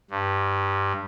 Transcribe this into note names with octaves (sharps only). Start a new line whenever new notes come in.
G2